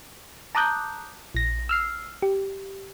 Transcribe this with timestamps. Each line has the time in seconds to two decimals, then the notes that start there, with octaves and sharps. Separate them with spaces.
0.55 A5 A#5 D6 D#6 F#6 G6
1.35 A#1 A#6
1.69 E6 F6 C7
2.22 G4